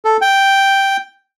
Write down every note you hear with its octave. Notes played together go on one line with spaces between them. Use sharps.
A4
G5